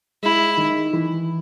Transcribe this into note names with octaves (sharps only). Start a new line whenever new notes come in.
G#3 E4
D#3
E3